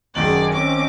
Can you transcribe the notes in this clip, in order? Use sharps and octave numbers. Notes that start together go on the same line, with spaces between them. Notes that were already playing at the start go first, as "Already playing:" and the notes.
G#1 F#2 D#3 G#4 D5 F#7
C4 C#4 D#5 D6